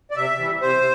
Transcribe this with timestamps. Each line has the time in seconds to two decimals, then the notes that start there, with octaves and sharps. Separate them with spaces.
0.11 D5
0.16 C3 E5
0.39 E3 G3
0.62 C3 C5